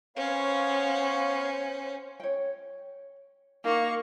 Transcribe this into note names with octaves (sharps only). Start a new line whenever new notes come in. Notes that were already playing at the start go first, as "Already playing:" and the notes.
B3 C#4 C5 C#5 F5
C#5 G5
A#3 D#4 F#4 C#6